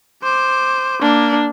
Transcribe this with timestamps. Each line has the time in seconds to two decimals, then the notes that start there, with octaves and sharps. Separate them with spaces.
0.23 C5 D6
1.02 A#3 D4